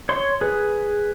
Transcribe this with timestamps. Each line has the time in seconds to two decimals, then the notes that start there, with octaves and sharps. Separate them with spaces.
0.09 C#5 C6
0.41 G#4 B4